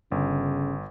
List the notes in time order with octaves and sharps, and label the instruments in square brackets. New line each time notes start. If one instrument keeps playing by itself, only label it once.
[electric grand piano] G1 [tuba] C#3